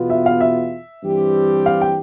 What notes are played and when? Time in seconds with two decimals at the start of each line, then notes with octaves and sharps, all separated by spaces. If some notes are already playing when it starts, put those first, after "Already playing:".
Already playing: E2 B2 B3 F4
0.10 E5
0.26 F5
0.40 E5
1.04 G2 E3 G3 C4 G4
1.66 F5
1.81 G5